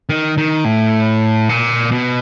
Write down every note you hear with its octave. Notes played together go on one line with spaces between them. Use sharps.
D#3
D#3
A2
A#2
B2